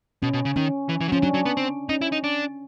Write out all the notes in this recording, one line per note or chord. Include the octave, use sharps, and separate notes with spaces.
B2 C#4
B2
C#3
D#3 C#4
E3
E3
F#3
F3 C#4
F#3 D4
F#3
B3
C4
C#4 D#4
E4
D#4
D4